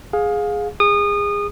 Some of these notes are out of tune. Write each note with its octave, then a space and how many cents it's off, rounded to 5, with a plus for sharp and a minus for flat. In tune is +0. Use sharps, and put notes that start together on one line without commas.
G#4 +0 F5 +25
G#4 -25 D#6 -25